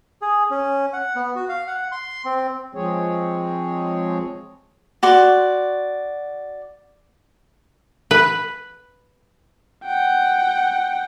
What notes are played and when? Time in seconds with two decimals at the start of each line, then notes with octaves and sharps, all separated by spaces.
0.22 G#4
0.51 C#4
0.93 F#5
1.15 B3
1.35 F#4
1.49 F5
1.67 F#5
1.92 C6
2.25 C4
2.75 F3 G#3 C4 G#4 C#5
5.03 F#4 D5 C6
8.11 B4
9.85 F#5 G5